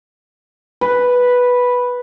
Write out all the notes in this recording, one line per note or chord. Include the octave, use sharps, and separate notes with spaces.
B4